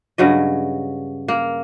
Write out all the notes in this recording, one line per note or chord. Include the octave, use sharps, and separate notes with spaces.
G2 C#3 F#3 D#5
A#3